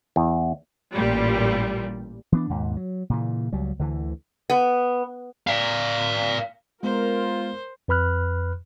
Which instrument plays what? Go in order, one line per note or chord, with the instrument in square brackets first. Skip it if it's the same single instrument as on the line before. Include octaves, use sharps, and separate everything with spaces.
[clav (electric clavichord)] E2
[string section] A1 A#2 G3
[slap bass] E3 B3 D4
D#2 G#2 B2
F#3
A#2 C#3 E3
C#2 F#3 G3
D2 D3 E3
[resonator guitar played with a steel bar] B3
[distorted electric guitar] D5 F5
[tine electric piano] G#3 B3 [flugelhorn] F4 [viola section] A#4 [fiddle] C5
[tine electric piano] F2 B4 B5 F6 F#6